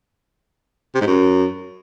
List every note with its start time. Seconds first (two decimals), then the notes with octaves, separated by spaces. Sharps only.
0.95 C3
1.01 G#2
1.07 F#2